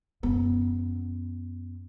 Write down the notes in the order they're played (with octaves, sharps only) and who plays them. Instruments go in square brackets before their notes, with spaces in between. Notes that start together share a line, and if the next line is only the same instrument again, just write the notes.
[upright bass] F#2 B3